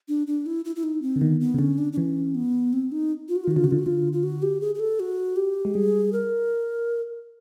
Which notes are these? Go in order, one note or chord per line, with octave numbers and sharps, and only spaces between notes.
D4
D4
E4
E4
E4
D#4
C4
D3
D#3 B3
B3
C#3
D3 C#4
D4
D4
E3 C#4
B3
C4
D#4
F4
F#4
F4
D#3
F#4
D3 F4
C#3 F#4
D3 F4
F#4
D3 F4
F4
F#4
G4
G#4
G#4
A4
F#4
G4
G#3
G3 G#4
A#4